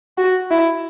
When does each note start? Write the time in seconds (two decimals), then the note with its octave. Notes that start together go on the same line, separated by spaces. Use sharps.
0.18 F#4
0.51 E4